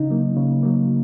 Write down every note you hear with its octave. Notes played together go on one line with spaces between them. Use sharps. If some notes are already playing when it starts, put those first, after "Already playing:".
Already playing: C#3 D#4
F#3 A#3
C#3
F#3 A#3